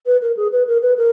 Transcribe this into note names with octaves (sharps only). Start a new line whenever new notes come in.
B4
A#4
G#4
B4
A#4
B4
A#4